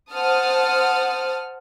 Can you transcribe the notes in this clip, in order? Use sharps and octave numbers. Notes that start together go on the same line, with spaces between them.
C5 F#5 A5 D#6 F6